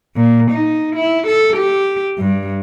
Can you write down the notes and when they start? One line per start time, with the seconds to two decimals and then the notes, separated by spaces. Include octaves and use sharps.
0.16 A#2
0.51 D#4
0.96 E4
1.27 A4
1.56 G4
2.18 G2